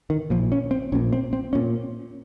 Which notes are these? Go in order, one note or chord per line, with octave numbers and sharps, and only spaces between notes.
D#3
A#1 A#2 F3
C#4
C4
A#1 A#2 C#4
C4
C4
A#2 C#4